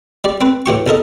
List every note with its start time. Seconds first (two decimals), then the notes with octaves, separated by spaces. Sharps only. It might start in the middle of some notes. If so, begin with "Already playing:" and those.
0.24 G3 D5
0.41 C4 B4
0.66 A2 E3 G4 C#6
0.86 B1 A4 A#4 D#5